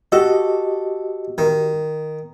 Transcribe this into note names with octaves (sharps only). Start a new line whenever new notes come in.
F#4 G4 A4 D#5
D#3